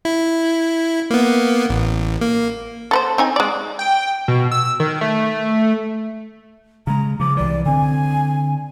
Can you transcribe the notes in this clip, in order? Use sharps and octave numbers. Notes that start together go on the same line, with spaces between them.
E4
A#3 B3
A1
A#3
A4 B4 C5
C4 D#4 G#5
G#3 D5
G5
B2
E6
D#3
A3
C#3 G#3 A#5
C#3 F3 D6
C2 E3 D5
D3 C4 G#5